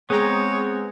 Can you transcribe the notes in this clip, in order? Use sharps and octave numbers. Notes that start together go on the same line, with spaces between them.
G#3 B3 C4 G#4 C#5 G5 A#5